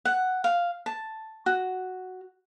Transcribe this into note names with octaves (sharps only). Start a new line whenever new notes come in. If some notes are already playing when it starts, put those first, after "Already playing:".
F#5
F5
A5
F#4